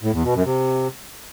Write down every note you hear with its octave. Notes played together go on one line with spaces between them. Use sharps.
A2
E2
B2
F#2
C3